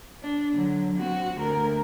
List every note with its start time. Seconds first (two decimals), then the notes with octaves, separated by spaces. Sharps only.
0.23 D4
0.54 D3 F#3
0.98 C4 F#4
1.36 D2 A#4